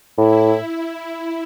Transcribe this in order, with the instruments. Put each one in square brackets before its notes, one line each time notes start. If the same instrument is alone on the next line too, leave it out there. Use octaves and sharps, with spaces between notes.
[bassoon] A2 [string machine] E4